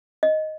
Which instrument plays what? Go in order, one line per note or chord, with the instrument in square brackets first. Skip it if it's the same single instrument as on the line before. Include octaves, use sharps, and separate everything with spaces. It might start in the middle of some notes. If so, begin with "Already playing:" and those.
[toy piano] D#5